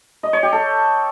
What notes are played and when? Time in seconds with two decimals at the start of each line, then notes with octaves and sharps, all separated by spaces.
0.23 D#5
0.33 C#5
0.43 G4
0.52 A4